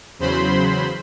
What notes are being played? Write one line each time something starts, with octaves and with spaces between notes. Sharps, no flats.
E2 C#3 F#3 C5 B5 C6